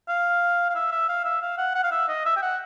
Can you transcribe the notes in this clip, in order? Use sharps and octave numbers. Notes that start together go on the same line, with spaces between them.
F5
F5
E5
E5
F5
E5
F5
F#5
F#5
F5
E5
D#5
E5
G5
F#5